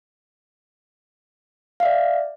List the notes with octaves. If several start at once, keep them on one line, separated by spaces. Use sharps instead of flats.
D5 E5 F5